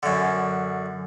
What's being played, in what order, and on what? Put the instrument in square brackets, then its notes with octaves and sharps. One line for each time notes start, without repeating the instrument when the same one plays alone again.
[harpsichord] F#2 D3